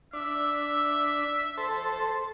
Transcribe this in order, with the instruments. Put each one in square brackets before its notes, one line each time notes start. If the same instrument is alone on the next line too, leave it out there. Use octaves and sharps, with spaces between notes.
[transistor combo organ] D4 [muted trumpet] E5
[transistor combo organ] A4 C5